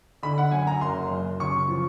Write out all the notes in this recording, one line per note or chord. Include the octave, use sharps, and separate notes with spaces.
D3 B5
F#5
F#2 G#5
A#5
F#1 C6
F#2
C#3 C#6
F3